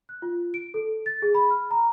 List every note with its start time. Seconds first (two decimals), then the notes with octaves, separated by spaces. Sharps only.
0.09 F#6
0.22 F4
0.54 D7
0.74 A4
1.06 A6
1.22 G#4
1.35 B5
1.51 F6
1.71 A#5